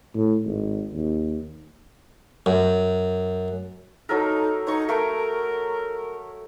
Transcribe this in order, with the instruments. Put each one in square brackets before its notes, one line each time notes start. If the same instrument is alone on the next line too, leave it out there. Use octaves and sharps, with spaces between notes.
[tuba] A2
G#1
D#2
[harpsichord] F#2
[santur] F#3 A4 A#4 [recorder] D#4
[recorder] D#4 [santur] C#5 C#6
[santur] A3 [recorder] A#4